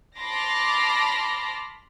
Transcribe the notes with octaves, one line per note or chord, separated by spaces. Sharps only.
A5 B5 C6 D6 F6 A#6